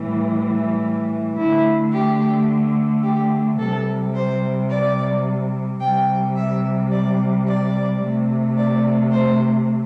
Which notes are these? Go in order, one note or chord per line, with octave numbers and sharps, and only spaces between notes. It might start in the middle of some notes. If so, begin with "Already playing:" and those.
Already playing: A2 E3 G3
D3 A3 E4
G4
G4
C3 G3 A4
C5
D5
C3 G3 G5
E5
D5
D5
C3 A3
D5
C5